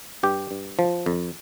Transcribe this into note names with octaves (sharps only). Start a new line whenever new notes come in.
G2 G4
G2
F3
F2